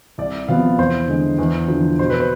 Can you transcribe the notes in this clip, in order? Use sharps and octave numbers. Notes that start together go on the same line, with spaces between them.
C2 D5
C3 F3 B3 F5
E2 C5
D3 G#3
E2
D3 F3
B2 C5
B4
C5